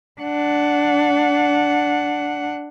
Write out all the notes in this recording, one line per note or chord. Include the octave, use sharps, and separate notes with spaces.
D4 F#5